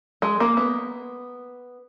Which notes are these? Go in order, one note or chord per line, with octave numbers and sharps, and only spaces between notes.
G#3
A#3
B3